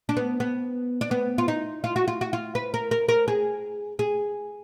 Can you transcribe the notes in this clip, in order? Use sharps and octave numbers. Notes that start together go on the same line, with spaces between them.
D4
B3
B3
D4
B3
F4
D#4
F4
F#4
F4
F#4
F4
B4
A#4
A#4
A#4
G#4
G#4